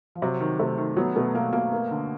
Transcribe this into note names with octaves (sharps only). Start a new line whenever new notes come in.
F3
C3 F#3
D#3
C3 A3
D#3
F#3 B3
B2 A3
B2 A#3
B2 A#3
A#3
D3